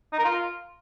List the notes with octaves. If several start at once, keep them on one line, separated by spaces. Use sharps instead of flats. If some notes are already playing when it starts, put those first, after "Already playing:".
D#4
A#4
F4